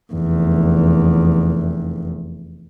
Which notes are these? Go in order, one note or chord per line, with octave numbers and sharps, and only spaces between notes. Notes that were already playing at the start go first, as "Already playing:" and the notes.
F1 E2